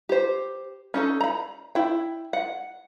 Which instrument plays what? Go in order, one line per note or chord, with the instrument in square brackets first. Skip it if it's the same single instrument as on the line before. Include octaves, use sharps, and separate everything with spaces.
[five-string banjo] G4 C5
C#4 D#4 A4
A#5 B5
E4 G5
F#5